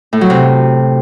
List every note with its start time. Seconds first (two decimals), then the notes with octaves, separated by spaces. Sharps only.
0.13 A2
0.21 F#3
0.30 C3